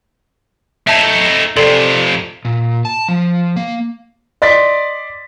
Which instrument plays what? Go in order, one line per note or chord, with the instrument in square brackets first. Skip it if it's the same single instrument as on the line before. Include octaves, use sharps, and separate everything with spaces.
[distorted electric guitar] A3 D#4 [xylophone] E5 A5 G#6
[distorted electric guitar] F2 C3 [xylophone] A4 D5 C6
[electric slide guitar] A#2
A5
F3
A#3
[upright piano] D5 D#5 C6 A6 B6